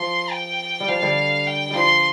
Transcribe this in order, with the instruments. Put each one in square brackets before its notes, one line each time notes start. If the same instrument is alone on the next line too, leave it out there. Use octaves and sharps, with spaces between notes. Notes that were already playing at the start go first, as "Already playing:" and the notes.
Already playing: [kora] F3 [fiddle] C6
[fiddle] G5
[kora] G3
[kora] F3 [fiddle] F5
[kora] D3 G3
[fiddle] G5
[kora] F3 G3 [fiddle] C6